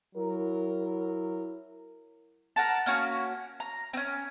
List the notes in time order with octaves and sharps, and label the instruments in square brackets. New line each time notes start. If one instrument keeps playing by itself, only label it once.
[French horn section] F#3 E4 A#4
[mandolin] A#4 F#5 A5
A#3 C#4 F#4
A#5
C4 C#4